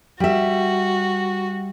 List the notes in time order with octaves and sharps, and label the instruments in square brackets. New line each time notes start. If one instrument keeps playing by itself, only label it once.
[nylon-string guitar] G3 E5 [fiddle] F#4